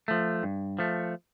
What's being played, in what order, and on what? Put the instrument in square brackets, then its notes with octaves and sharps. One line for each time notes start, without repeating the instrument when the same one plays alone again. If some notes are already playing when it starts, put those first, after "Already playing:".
[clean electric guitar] F3 A3
G2
F3 A3